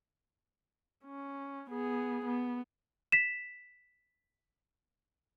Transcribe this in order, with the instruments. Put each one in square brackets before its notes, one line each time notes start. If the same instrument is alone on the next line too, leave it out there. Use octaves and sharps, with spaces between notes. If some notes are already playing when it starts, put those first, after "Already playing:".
[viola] C#4
B3 G#4
B3
[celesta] B6 E7